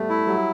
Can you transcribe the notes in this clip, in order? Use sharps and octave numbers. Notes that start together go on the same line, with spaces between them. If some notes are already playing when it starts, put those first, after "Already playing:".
Already playing: G3 A3 B3
E4
F#3 G3